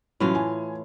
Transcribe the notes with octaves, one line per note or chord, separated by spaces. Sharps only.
A2 E3 F#3 C#4 F4
G#5